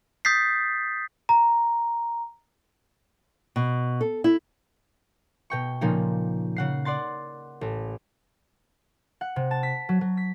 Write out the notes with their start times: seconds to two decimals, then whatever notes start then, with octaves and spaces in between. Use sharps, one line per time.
0.25 D#6 G6 A6 B6 C7
1.29 A#5
3.56 B2
4.01 A4
4.24 E4
5.50 B2 G5 C#6
5.81 A#2 C#3 F3 A#3 D#4
6.56 C#3 F#5 C7
6.85 D5 F#5 C6 A6
7.61 A1
9.21 F#5
9.36 C3
9.51 A5
9.63 B6
9.89 F#3
10.01 F#3
10.17 B6